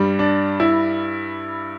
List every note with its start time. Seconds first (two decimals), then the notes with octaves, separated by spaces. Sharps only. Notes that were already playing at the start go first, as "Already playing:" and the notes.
Already playing: G2 G3
0.19 D4
0.60 E4